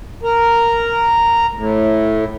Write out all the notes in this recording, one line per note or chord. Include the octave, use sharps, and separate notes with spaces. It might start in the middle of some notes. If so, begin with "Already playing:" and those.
A#4
A2